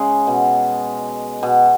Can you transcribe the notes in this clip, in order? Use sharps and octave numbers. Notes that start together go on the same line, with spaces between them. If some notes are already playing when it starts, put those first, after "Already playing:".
Already playing: C#3 G#3
B2
B2